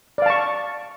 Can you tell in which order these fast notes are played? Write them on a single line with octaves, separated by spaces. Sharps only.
D5 F5 A5 C#6